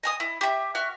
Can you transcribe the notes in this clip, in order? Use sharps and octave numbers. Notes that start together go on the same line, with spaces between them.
D#5 G#5 D#6
E4
G4 E5
F#4 E5 F6